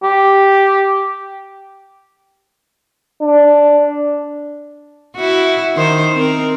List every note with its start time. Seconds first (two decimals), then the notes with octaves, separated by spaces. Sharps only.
0.03 G4
3.22 D4
5.16 E4 F#4
5.76 D#3 D#4 C5
6.15 C4 A#4